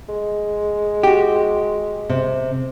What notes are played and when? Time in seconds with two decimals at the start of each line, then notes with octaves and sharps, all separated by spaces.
0.09 G#3
1.03 F#4 G4
2.09 C3